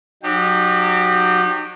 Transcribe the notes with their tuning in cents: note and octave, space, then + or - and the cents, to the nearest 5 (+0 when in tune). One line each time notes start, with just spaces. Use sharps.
F#3 -20 D#4 -40 G4 +0